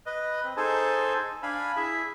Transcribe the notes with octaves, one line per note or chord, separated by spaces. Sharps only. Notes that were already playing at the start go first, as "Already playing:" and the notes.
B4 D#5
C4
D#4 G#4 A4 C5 G#5 A5
D4 F5 G#5 B5
E4 G#4 E5